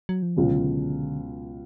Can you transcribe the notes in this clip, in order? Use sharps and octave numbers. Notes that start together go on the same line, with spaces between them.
F#3
F3
C#2 B2 D3 F#3 C#4